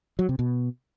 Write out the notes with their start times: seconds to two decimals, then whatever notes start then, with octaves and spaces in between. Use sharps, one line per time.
0.19 F#3
0.29 C3
0.39 B2